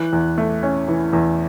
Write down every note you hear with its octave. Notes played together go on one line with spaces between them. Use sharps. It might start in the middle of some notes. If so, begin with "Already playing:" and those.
Already playing: E3 F#6
E2
A3
C#4
E3
E2